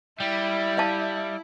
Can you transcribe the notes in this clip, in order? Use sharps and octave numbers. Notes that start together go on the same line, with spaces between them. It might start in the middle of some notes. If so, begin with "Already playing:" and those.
G3 E4
E5 F5 A5